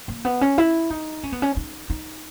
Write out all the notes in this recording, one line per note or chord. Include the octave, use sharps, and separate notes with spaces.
A#3
B3
C#4
E4
D#4
C#4
B3
C#4
D#4
D#4